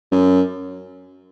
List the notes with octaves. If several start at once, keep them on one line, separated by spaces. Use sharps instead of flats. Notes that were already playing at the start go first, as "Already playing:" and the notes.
F#2